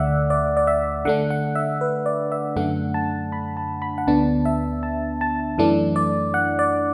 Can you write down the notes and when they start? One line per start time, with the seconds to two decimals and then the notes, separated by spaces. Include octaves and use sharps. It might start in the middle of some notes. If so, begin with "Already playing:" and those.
Already playing: D2 D3 A3 D5 E5 F#5
0.30 D5
0.57 D5
0.67 E5
1.05 D3 A3 D4 F#5
1.30 F#5
1.55 E5
1.81 B4
2.06 D5
2.32 E5
2.56 F#2 D3 A3 D4 F#5
2.94 A5
3.32 B5
3.57 A5
3.82 B5
3.98 F#5
4.07 D2 D3 B3 D4 A5
4.45 E5
4.83 A5
5.21 A5
5.58 F#2 E3 A3 D4
5.96 D5
6.34 F#5
6.59 D5